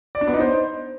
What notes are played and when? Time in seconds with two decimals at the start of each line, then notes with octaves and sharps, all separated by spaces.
0.15 D5
0.21 D4
0.27 B3
0.34 D#4
0.40 C5